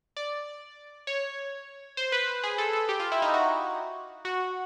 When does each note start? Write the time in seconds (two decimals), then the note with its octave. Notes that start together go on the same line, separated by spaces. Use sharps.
0.17 D5
1.07 C#5
1.97 C5
2.12 B4
2.43 G#4
2.58 A4
2.73 A4
2.89 G4
3.00 F4
3.12 E4
3.22 D#4
3.34 F#4
4.25 F#4